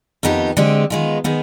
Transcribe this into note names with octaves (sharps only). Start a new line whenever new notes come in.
F2 D#3 B3 D#4 G4
D3 G#3 C4 G4
D#3 G#3 B3 F4
D#3 G#3 B3